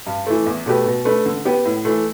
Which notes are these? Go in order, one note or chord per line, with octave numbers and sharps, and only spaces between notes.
G2
E3 A3
E2
B2 A3 G4 B4
B2
A3 D4 B4
D3
B3 G4
A2
E3 A3